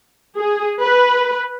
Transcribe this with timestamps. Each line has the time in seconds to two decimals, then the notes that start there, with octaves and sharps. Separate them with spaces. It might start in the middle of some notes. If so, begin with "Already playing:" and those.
0.37 G#4
0.81 B4